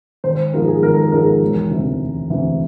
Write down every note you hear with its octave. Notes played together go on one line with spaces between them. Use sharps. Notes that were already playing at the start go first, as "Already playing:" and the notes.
G#1 C5
G#2 F3 G#3 A#4
G#4
G#1 A#4
A4
A#4
G#2 F3 G#3 A#4
A#4
E1
D2 C3 E3
E1
D2 C3 E3